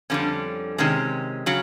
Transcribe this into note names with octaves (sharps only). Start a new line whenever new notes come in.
F2 D3 G3 C#4
C3 D#3 G#3 C#4
C#3 F#3